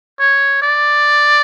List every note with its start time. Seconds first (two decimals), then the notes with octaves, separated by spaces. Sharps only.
0.20 C#5
0.62 D5